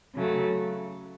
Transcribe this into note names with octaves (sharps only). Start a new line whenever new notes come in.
C#3 F#3 A3